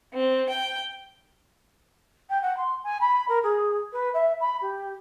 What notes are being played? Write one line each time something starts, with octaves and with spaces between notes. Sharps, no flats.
C4
G5
G5
F#5
C6
G#5
B5
A#4
G#4
B4
E5
B5
G4